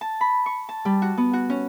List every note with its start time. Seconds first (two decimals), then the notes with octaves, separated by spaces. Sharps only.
0.01 A5
0.21 B5
0.46 C#6
0.69 A5
0.85 G3
1.02 F#4
1.18 B3
1.33 F#4
1.50 C#4